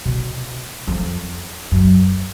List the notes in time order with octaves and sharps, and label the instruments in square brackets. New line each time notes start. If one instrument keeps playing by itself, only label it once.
[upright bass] B2
F2
F#2